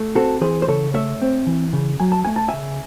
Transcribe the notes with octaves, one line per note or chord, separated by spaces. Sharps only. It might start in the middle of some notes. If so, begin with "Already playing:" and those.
Already playing: A3
C4 F#4 A4
E3 G#4 C5
C5
C#3 A4 C#5
A3 C#5 E5
C4
E3
C#3
F#3 G#5
A5
A3 G#5
A5
C#3 E5 G#5